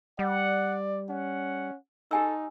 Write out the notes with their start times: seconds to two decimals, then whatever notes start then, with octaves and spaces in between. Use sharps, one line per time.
0.19 G3 D5 F#5
1.09 C#4 F#5
2.11 D#4 G4 A4 G#5 E6